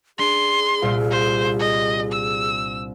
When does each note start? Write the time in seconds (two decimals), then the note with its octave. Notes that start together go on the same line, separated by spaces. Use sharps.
0.19 D4 G#4 C6
0.82 C2 A#2 F4
1.11 C5
1.60 D#5
2.12 E6